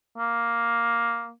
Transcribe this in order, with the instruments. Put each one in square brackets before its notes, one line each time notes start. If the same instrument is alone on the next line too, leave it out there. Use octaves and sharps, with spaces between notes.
[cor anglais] A#3